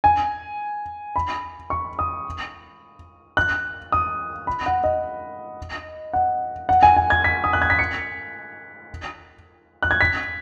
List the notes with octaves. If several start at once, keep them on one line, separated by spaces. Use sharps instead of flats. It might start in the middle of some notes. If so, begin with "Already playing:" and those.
G#5
B5
C#6
D#6
F#6
D#6
B5
F#5
D#5
F#5
F#5
G#5
G#5
G#6
B6
D#6
F#6
G#6
B6
C#7
F#6
G#6
B6